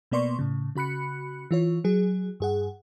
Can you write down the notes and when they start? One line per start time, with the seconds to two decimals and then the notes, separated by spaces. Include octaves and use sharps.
0.11 B2 A#3 B3 D5 C6 C#6
0.39 A2 C#3
0.76 C#3 F#4 B5 F#6 C#7
1.51 E3 F4 C#5
1.84 F#3 G#4
2.40 G2 G#4 F#5